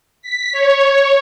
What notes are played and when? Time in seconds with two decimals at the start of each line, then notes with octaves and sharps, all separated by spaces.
0.22 B6
0.52 C#5